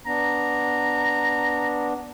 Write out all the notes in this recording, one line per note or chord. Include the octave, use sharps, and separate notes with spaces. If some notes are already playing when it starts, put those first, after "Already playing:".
B3 D4 A#5